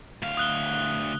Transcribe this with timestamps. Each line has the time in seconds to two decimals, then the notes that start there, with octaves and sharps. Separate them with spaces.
0.23 D2 F5
0.37 D#6 F#6 G7